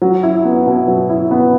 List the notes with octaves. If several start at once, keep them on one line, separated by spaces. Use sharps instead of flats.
F#3
E4
B3
B2
F#3
E4
B3